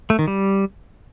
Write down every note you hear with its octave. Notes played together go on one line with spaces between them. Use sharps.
A3
D#3
G3